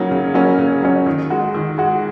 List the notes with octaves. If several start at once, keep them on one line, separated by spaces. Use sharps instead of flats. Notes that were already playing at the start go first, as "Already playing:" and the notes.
Already playing: C#3 F#3 A#3 C#4
C#3
F#3 A#3 C#4
C#3
F#3 A#3 C#4
D#3
G#3 F#4
D#3
G#3 F#4